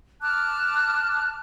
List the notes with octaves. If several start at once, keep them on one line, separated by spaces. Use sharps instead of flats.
A5 D6 F6 F#6